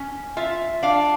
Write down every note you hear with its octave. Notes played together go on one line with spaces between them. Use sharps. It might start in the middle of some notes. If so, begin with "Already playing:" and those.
Already playing: C#4
F4 E5
D4 F5